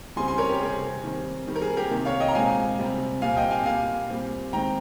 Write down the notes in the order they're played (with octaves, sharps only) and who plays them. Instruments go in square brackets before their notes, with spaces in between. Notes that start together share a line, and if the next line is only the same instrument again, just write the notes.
[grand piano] C#3 G3 C4 G#5 C6
G#5 C6
A#4 C#5
G4 A#4
C3 G3 C4 G#4
D#3 G3 C4
D#3 G3 C4
A#4
G#4
G4 A#4
C3 D#3 A#3
C#5 F5
D#5 G5
A#5
A#2 G#3 C4 F5 G#5
C3 G3 C4
A#2 G3 C4 F5 G#5
D#5 G5
F5 G#5
A#2 G3 A#3 F5 G#5
A#2 G3 C4
D#3 G#3 C4 G5 A#5